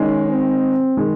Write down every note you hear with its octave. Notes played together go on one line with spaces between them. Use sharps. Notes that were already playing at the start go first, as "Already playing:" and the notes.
Already playing: D#3 G#3 C#4 D#4
C4
D#3 G#3